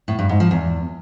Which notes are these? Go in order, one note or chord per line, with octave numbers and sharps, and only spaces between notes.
A2
G2
G#2
F3
E2